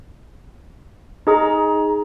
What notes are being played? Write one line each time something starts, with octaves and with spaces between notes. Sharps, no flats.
D#4 G#4 A#5